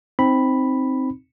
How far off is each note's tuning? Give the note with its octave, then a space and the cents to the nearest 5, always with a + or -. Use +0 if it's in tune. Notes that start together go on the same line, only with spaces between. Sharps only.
C4 +0 D#4 +0 B5 +0